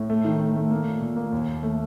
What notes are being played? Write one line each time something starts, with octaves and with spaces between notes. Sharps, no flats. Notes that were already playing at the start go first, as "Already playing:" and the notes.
Already playing: A2
A3
D#3
A3
A3
A#3
A#2
A#2
A#3
D#2
D#2
A3